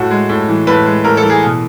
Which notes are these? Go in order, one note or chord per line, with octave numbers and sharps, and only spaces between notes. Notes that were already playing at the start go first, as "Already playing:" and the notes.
Already playing: A2 F#4
G#3
A2
E3
A2 B4
G#3
A2 A#4
A4
E3
G#4
B2